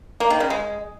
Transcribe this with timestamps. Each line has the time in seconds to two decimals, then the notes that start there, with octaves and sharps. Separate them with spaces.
0.20 A#3
0.30 D#3
0.40 C#3
0.50 G#3